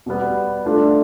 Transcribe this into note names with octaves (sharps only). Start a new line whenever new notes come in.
B2 G3 B3
A3 D4 F4 A4